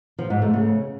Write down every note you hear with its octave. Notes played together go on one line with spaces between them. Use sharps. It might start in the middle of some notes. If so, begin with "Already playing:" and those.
F3
G#2
A3
C#3